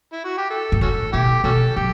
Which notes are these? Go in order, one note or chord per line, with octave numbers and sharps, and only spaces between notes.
E4
F#4
G4
A4
G2
A2 C#4 F#4 A4
B2 E4 G4
B2 C#4 F#4 A4
F#3 G4